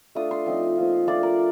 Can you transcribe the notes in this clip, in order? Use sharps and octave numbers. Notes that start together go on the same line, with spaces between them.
A3 D4 F4 D#6
C6
F3 C4 D#4
F3 A#3 F4
A3 D4 F4 D5
A#4